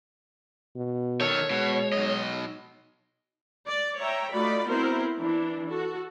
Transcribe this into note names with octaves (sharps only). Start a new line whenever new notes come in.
B2
D#3 A4 C#5
B2 G#3
B1 D#5
D5
C#5 E5 G5 A#5
A3 D#4 F4 F#4 D5 B5
B3 C4 E4 F#4 A#4 C5
E3 D4
F#4 A4